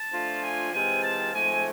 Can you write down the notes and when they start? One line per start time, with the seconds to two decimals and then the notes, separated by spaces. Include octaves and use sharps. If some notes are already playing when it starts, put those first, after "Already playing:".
Already playing: A5
0.12 F3 A3 D4 F4
0.42 G#5
0.72 C3 E3 G#3 C4 F4 G#5
1.03 A5
1.33 G#2 F3 A3 C4 G#5